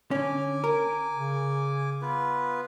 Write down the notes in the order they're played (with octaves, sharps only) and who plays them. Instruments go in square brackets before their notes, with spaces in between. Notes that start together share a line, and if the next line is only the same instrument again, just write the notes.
[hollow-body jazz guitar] D3 C#4 [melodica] G#5 D6
[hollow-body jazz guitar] A#4
[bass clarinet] C#3
[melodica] B3 F4 B4